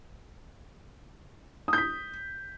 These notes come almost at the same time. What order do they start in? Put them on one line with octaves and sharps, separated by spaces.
D#6 G6 B6